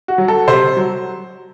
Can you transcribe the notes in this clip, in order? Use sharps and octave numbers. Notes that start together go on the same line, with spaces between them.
F#4
F#3
A4
C3 C5
F#3